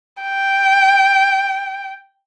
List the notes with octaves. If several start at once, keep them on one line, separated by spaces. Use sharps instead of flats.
G5